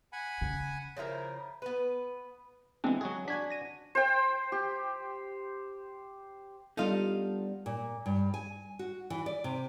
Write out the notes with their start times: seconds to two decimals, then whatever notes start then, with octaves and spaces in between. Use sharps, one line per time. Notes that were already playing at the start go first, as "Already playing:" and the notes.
0.13 F#5 G#5 B5
0.41 C#3
0.97 C#3 F3 E4 A#4
1.62 B3 B4
2.84 E3 G#3 B3 C4 D4
3.01 F#3 F#4 G#4
3.28 D4 F#4 G#5 G#6 B6
3.50 A#6 D#7
3.95 C5 G5
4.52 G4
6.77 G3 B3 D4 D#4 F4 A4 D#5 F5
7.66 A#2
8.06 G2
8.34 G#5
8.79 F#4
9.10 E3
9.26 D5
9.44 C3